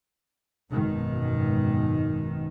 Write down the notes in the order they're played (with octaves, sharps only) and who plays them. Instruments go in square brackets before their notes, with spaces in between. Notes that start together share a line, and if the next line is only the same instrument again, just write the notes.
[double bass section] G#1 F#2 B2 D#3